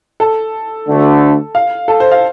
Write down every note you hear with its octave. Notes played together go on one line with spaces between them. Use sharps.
A4
D2 D3 A3
F5
A4
C5
F5